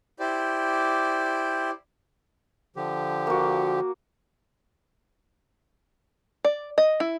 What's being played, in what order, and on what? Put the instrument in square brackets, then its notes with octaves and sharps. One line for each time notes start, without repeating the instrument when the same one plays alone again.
[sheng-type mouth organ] E4 G4 C5 D5
[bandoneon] D3 F3 G4
[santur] A#3 F#4
[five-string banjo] D5
D#5
E4